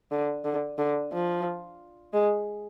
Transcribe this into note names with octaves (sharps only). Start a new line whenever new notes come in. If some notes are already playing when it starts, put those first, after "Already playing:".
D3
D3
D3
F3
G#3